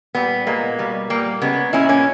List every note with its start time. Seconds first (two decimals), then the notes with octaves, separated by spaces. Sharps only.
0.15 A#2 G3 B3
0.47 A#2 G#3 A#3
0.79 B2 G3
1.10 A#2 G3 A#3
1.41 C#3 G#3 B3
1.73 A#2 G#3 C#4 E4
1.89 A#3 C#4